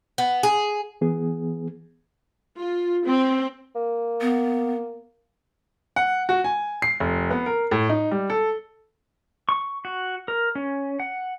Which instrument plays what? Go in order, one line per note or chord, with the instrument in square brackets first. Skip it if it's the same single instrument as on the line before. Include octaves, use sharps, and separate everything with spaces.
[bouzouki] B3
G#4
[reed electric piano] E3 B3 G#4
[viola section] F4
C4
[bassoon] A#3
[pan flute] B3
[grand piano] F#5
F#4
G#5
C7
F1
B3
A#4
A2
D#4
G3
A4
[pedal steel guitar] C#6
F#4
A#4
C#4
F#5